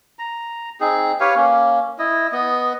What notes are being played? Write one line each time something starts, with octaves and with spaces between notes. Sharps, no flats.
A#5
C4 D#4 G#4
G4 B4 C#5 F5
A#3 C#4
E4 D#5
B3 D#5